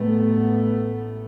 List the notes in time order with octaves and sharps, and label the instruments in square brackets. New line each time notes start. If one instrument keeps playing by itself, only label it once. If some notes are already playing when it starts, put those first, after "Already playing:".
Already playing: [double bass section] A1 A2 A3 B3